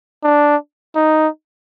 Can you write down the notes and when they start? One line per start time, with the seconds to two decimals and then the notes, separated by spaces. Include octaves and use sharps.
0.24 D4
0.96 D#4